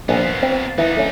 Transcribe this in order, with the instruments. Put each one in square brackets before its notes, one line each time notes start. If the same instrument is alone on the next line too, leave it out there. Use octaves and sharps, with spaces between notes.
[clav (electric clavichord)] A#1 [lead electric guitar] B3 F4
[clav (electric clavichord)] C4
[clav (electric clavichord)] E3 [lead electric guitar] B3 D#4
[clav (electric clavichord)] A3 C#4